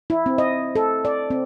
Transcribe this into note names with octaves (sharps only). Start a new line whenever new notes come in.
E4
C4
D#5
A4
D5
C4